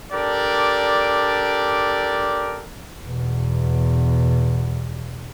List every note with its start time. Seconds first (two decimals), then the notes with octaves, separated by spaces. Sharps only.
0.12 D4 G4 A4 A#4 D5
3.04 E2 B2